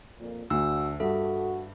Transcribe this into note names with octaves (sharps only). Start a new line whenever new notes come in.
F2 A#2
D2 D4 F#4 E6
G2 F#4 A4 E5